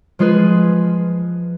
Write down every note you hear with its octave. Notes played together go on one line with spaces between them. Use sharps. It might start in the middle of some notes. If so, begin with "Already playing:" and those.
F3 G#3 F4 G#4 B4